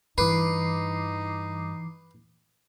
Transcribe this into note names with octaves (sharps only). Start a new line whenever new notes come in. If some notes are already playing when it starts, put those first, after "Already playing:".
G2 E3 D#4 B4 D6 C7